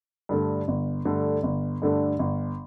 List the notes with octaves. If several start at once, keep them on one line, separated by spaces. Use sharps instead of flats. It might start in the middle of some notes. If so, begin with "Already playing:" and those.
G2 D3 A3
G1
G2 D3 A3
G1
G2 D3 A3
G1